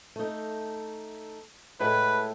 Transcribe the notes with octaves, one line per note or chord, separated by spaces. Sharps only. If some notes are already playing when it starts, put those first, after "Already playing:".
A3 D#4
A2 G#3 A3 B4